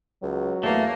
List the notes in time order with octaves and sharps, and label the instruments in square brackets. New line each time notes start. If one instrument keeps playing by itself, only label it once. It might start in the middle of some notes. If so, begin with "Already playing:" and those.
[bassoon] C#2 [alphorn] F#3
[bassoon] E2 [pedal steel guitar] A3 [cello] A#3